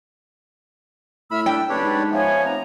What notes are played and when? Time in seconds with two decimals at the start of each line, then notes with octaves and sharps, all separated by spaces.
1.31 A2 E5 B5 E6 F6
1.46 D4 G5 E6
1.70 F#1 D4 G4 B4 C#5 D5
1.84 G#2
2.12 F3 B3 C#5 E5 G#5
2.45 F1 A#5